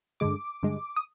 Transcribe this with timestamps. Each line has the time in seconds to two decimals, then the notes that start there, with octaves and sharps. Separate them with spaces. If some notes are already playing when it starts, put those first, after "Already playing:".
0.20 G2 D3 G#3 D6
0.63 G2 D3 G#3
0.96 D#6